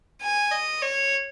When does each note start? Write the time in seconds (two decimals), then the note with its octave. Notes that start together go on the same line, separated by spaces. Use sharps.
0.22 G#5
0.51 D#5
0.82 C#5